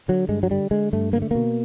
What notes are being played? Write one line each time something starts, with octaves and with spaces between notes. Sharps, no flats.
D3 F#3
G2 G#3
F#3
D3 G3
D3 G#3
G2 A3
D3 A#3
A3
B2 A#3